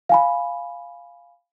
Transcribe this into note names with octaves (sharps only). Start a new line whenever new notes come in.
F5 G#5 B5